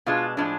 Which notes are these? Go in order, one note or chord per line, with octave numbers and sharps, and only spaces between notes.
B2 G#3 D4 F4
A2 F3 G#3 D4